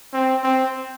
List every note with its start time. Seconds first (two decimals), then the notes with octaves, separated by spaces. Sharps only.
0.13 C4
0.44 C4